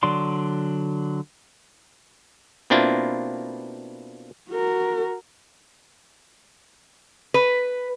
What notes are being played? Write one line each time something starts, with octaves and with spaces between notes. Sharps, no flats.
D3 F#3 D5 C6
B2 A#3 C4 D4 E4 F4
F#4 A#4
B4